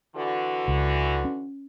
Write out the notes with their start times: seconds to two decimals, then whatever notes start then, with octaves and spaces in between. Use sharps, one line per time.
0.16 D3 E3 F#4
0.68 C#2
1.25 C#4